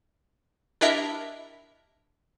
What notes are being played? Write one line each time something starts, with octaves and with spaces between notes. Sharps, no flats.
D4 E4 G4 A#4 D#5 E5